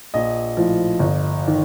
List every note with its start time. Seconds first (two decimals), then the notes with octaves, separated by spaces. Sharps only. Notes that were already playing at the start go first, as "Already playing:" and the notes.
0.14 A#1 D#5
0.57 A2 F3
0.99 G1
1.48 D#3